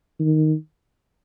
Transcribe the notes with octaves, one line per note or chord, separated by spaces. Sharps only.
D#3